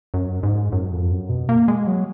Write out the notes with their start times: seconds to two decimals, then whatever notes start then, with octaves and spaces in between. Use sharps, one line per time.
0.14 F#2
0.43 G#2
0.72 F#2
0.92 F2
1.11 F#2
1.29 B2
1.49 A#3
1.68 G#3
1.87 F#3